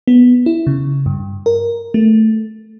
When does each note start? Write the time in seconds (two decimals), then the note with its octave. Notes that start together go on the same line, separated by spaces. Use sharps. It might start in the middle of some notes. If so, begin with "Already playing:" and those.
0.08 B3
0.46 E4
0.67 C#3
1.06 G2
1.46 A#4
1.94 A3